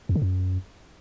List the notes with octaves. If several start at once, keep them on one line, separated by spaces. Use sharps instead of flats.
F2
D3
F#2